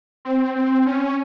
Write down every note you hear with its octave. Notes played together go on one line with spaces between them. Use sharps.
C4
C4
C#4